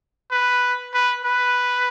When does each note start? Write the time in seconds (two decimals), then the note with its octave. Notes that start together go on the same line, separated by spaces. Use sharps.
0.31 B4
0.94 B4
1.25 B4